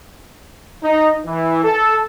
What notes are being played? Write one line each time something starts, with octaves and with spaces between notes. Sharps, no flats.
D#4
E3
A4